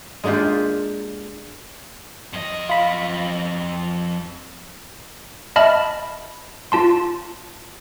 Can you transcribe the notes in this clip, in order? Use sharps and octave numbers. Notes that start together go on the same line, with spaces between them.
G#3 A#3 D4 F4 G4
F2 D#5
F4 B5
D#5 E5 A5 B5 F6
F4 A5 C6